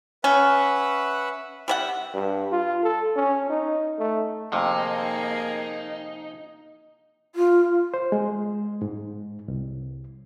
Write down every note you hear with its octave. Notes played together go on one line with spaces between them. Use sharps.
C#4 B4 E5 F#5
G3 C#5 E5 F#5
G2
F4
A4
C#4
D#4
A3
F2 C3 D#3 A#3 D#4 G#4 A#4
F4
C5
G#3
G#2
C2